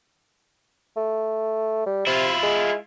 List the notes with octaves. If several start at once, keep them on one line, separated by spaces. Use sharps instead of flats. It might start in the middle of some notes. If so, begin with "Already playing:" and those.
A3
G3
C3 E4 F4
G#3